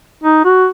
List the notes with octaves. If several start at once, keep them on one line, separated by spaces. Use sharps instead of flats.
D#4
F#4